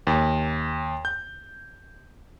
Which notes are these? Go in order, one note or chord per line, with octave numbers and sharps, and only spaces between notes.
D#2
G6